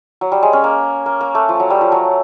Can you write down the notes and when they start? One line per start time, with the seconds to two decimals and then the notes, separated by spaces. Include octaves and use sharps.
0.21 F#3
0.32 G3
0.43 G#3
0.53 C#4
0.64 A#3
1.06 A#3
1.21 A#3
1.35 A3
1.49 F3
1.60 F#3
1.70 G3
1.81 F3
1.92 F#3